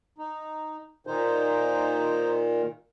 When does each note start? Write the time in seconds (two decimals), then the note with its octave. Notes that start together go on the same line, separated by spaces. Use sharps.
0.18 D#4
1.07 A#2 D#3 D#4 C5